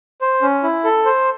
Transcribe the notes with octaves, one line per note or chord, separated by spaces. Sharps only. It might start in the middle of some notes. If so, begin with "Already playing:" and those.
C5
C#4
E4
A4
C5